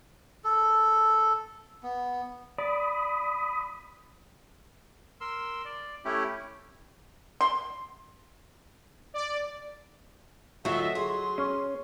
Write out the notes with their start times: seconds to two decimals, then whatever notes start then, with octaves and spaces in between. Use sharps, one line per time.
0.44 A4
1.83 B3
2.58 D5 B5 D#6
5.21 A#4 C6 E6
5.65 D5
6.05 A3 C#4 E4 G4
7.41 C6
9.14 D5
10.65 D2 F#3 F4 D#5 E5
10.95 G#4 C6
11.38 C#4